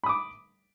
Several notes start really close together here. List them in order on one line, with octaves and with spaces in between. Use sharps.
B5 D#6 D6